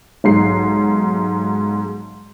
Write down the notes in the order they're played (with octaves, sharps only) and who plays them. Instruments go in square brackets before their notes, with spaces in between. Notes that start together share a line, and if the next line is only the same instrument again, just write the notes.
[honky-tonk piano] B1 G#2 C7